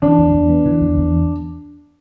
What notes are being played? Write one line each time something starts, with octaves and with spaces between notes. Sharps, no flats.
E3 D4
E2
E2
B3
E3
E2
E2